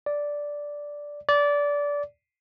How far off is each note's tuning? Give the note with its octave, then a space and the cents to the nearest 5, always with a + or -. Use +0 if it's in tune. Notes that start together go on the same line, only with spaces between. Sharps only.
D5 -5
D5 -20